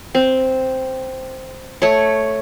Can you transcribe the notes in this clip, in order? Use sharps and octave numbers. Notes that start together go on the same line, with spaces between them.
C4
A3 C#5